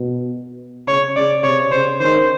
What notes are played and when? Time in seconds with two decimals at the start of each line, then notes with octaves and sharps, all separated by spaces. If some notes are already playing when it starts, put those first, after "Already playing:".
Already playing: B2
0.88 C#3 C#5
1.16 C#3 D5
1.44 C3 C#5
1.71 C#3 C5
2.00 D#3 C5